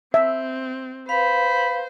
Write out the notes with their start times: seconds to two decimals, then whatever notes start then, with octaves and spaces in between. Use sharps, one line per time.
0.14 C4 E5
1.09 B4 C5 F5 B5